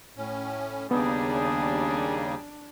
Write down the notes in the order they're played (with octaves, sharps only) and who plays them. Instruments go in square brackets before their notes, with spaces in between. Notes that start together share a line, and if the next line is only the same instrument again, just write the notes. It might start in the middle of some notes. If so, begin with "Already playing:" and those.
[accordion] A2 C#4
[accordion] D#2 C#3 [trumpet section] G3 D#4 G#4 [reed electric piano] B3 [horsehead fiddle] D4